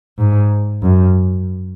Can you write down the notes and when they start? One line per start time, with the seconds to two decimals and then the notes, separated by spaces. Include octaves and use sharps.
0.19 G#2
0.83 F#2